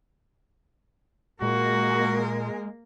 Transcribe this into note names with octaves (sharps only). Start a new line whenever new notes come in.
A#2 G#3 A#3 F#4 A#4